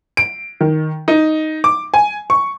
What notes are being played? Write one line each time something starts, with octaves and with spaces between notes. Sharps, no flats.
D7
D#3
D#4
D6
G#5
C#6